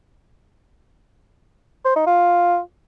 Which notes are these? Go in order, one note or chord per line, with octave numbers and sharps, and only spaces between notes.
C5
D#4
F4